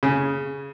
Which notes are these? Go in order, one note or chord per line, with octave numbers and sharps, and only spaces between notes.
C#3